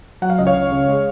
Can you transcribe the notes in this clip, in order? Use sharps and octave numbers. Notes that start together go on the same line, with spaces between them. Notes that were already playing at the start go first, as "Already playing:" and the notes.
F#3 F#5
F5
C#2 D#5
C#5 F5
C#2
C#3
G#3